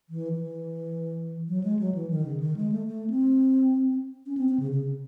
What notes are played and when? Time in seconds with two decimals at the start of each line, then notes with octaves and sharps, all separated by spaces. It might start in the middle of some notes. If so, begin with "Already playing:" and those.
0.10 E3
0.33 E3
1.48 F#3
1.64 G#3
1.79 F#3
1.95 E3
2.10 D#3
2.25 C#3
2.40 D#3
2.56 G#3
2.72 A3
2.88 A3
3.10 C4
4.26 C#4
4.37 C4
4.49 C4
4.60 C#3
4.71 C#3